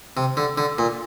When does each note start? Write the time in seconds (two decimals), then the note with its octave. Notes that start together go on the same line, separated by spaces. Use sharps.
0.17 C3
0.37 D3
0.58 D3
0.78 A#2